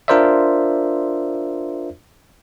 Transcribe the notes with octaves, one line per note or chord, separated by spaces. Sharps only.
D4 F4 A#4 C5 D5 E5